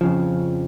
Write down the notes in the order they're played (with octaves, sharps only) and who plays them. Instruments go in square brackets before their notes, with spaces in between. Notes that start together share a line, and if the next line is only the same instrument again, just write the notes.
[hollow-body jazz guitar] F2 C#3 F3